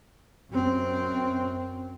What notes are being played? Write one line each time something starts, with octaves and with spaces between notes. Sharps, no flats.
F#2 C4